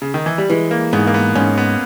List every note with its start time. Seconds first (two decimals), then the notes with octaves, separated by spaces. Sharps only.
0.02 C#3
0.14 D#3
0.26 E3
0.38 G3
0.50 E3 G#3
0.71 A#3
0.93 G#2 B3
1.07 A#3
1.14 B3
1.35 G#2 C#4
1.58 B3